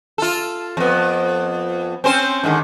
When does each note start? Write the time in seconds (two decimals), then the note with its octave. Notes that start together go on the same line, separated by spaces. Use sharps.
0.18 F4 A4
0.77 F2 B3
2.04 C4 C#4 C5
2.44 G#2 D3 D#3